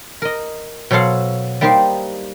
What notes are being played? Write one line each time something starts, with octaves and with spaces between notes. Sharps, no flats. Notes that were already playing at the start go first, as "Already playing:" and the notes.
A#4 D#5
B2 F#3 A4 C5 F5 F#5
G3 A#3 D#4 G4 C5